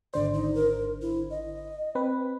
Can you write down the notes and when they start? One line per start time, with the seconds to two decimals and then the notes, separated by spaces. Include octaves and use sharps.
0.14 G#1 D3 C5 D5
0.34 D#4
0.55 A#4
1.02 E4
1.30 D#5
1.95 C4 B4